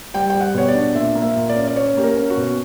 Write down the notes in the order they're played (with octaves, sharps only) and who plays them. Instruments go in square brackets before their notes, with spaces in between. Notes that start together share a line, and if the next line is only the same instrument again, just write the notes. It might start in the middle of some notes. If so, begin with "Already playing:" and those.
[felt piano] G3 G5
G3 G5
F#5
B2 C#5
D5
D4
A#2 E5
A#3
E5
A#2
D5
C#4
D5
C#4 C#5
A#3 G4
A#4
C#4
F#4
B2